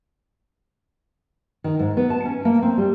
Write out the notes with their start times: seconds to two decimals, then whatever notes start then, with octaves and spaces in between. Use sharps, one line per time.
1.64 D#3
1.79 G#2
1.97 B3
2.10 A5
2.25 C#4
2.45 A#3
2.63 C4
2.77 G3